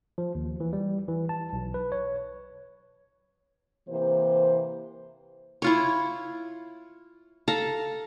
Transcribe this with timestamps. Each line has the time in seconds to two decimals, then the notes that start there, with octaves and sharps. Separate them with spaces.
0.18 F3
0.35 D#2
0.60 E3
0.73 G3
1.08 E3
1.29 A5
1.53 B1
1.74 B4
1.92 C#5
3.89 C3 E3 A#3 C5
5.62 E4 F4 C#5
7.48 A4 F5 A#5